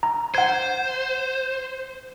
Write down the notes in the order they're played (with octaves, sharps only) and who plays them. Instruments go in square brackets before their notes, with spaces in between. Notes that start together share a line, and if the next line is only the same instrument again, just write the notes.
[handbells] A#5
[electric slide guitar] C5 [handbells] F#5 G#6